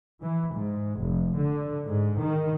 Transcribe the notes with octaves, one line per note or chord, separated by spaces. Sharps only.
E3
G#2
F1
D3
G#2
D#3